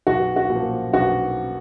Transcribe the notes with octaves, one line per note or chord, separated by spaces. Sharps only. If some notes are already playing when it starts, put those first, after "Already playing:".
B1 F#4
F#4
A#2 F3
B1 F#4